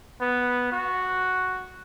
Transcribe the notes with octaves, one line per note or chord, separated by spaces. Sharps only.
B3
F#4